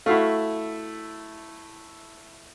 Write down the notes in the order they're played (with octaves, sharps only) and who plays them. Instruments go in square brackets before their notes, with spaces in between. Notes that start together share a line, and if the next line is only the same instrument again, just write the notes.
[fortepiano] A3 E4 [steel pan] F#4 E5 F5